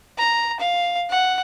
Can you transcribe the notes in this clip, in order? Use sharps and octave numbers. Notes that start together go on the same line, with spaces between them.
A#5
F5
F#5